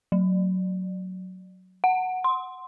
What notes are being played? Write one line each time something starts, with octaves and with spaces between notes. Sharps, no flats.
F#3
F#5
C6